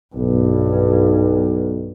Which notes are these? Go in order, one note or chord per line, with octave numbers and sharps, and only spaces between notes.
B1 G2